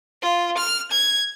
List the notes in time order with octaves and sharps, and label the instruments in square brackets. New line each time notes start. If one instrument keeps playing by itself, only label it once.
[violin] F4
F6
G#6